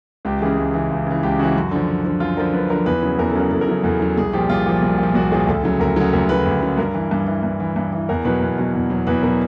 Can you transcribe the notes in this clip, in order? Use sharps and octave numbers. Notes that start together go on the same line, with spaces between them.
C#2 G4
C#3 E3 G#4
C#2
C#3 E3
C#2
C#3 E3
C#2 G4
C#3 E3 F#4
F#2
D3 F3
F#2
D3 F3
F#2 F4
D3 F3 A#4
F#2 B4
D3 F3 A#4
E2 B4
C#3 F#3
E2 A#4
A4
C#3 F#3 A#4
E2 A4
A#4
C#3 F#3
E2 A4
C#3 F#3
C2 G#4
A#2 F3 G4
C2 F4
A#2 F3
C2
A#2
F3
C2 F#4
A#2 F3 G#4
D2 A4
C#3 F#3 A4
D2 A#4
C#3 F#3 A4
D2 A#4
C#3 F#3 B4
D2
C#3 F#3
G2 A#4
E3
G2
E3
G2
E3
G2
E3
E2 A#4
B2 F#3 B4
E2
B2 F#3
E2
B2 F#3
E2 B4
B2 F#3 A#4